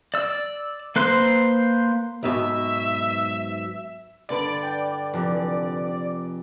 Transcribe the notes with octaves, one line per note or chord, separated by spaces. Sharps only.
D5 E6
A#3 B4 C5 C6
B1 G#2 B2 E5
G2 D3 B4 D5
G5
F1